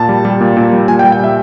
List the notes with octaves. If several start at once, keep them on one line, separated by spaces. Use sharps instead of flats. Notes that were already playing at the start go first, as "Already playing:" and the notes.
Already playing: A#2 A5
G3
G3
A#2
A#2
G3
A#2 G#5
G5
G3
G5
G3 E5